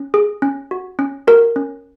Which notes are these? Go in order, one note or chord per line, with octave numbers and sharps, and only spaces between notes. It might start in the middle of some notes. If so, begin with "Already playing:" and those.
Already playing: C#4
G#4
C#4
F#4
C#4
F#4 A#4
C#4